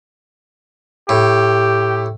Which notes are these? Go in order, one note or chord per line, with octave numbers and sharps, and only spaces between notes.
A2 G4